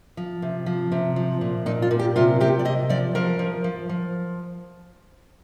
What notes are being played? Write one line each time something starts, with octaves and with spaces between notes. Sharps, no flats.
F3
C3
F3
C3
F3
A#2
A#2 D#4
F4
A#2
G4
C3 F4
C3 G4
D5
C3 D#5
F3 D5
F3 A#4
F3
F3
F3